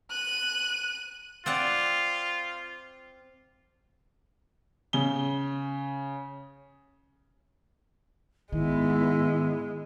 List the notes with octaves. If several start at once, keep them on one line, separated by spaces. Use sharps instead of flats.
F#6 D#7
C4 F4 D5 F#5
C#3 G7
G#2 D#3 G#3 B3 E4